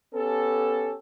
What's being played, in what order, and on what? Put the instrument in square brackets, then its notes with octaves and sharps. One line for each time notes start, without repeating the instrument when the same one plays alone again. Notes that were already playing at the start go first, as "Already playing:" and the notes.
[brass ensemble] B3 C#4 G4 A4